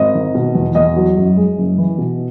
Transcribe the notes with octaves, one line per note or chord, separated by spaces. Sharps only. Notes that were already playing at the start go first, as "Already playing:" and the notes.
Already playing: G#1 D#5
D#3
B2
E2
E2 D#5
F#3
F#2
G#3
F#1
E3
B2